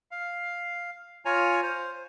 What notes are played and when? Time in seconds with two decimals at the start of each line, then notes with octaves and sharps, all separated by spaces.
0.11 F5
1.25 F4 C#5 G#5 A#5
1.63 C5